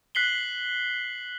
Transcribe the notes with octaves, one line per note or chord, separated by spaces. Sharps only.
F#6 B6 C7 F#7 G7